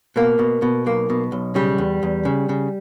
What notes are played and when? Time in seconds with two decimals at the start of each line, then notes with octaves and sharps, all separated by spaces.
0.16 B2 A#3
0.39 B2
0.62 B2
0.86 B1 A#3
1.10 B2
1.32 B1
1.55 C#3 G3
1.78 E2
2.03 E2
2.25 C#3
2.49 C#3